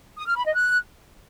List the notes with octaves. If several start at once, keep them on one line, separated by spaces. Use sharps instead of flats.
D#6
F6
B5
D#5
F#6